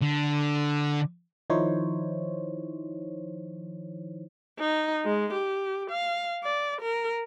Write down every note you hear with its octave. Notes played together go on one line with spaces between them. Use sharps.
D3
D#3 F3 D#4 E4 C5 C#5
D#4
G#3
G4
F5
D5
A#4